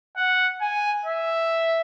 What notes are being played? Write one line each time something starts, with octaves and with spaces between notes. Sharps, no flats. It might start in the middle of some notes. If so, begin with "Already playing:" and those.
F#5
G#5
E5